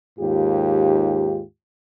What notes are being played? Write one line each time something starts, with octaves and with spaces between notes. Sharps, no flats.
D#2 G#2 F4 G4